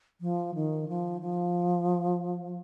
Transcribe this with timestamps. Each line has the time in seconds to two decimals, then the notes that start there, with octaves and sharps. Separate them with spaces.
0.21 F3
0.55 D#3
0.88 F3
1.21 F3